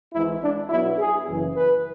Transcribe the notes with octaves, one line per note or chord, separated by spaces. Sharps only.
G#1 G#2 E3 G#3 E4
D4
B1 B2 F#3 B3 D4 E4
G#4
F#1 F#2 E3
B4